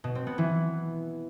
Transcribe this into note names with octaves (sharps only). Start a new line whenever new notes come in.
B2
C4
B3
E3